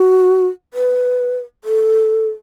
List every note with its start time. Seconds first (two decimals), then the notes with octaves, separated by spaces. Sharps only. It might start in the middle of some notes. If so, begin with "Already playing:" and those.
Already playing: F#4
0.74 B4
1.64 A4